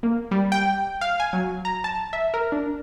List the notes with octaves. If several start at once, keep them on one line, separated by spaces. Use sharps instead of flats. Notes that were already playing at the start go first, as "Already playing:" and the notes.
A#3
G3
G5
F5
G#5
F#3
A#5
A5
E5
A#4
D4